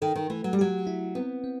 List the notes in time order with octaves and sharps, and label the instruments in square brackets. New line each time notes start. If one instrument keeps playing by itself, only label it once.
[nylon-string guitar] D#3 [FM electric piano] A4
[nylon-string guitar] D#3
[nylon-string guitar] E3 [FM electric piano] A3
[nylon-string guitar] F#3
G3
[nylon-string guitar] F#3 [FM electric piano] G4
[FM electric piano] E4
[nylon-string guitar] B3 [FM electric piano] C4
[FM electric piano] C4